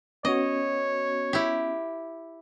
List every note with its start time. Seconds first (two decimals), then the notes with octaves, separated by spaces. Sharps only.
0.25 B3 C#4 F#4 C#5 D#5
1.33 E4 G4